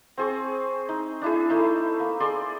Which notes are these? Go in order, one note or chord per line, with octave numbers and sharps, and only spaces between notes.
C4 G#4 C#6
D#4
D4 E4 G#4
A3 D#4 E4
A#3
G#4 D5 C6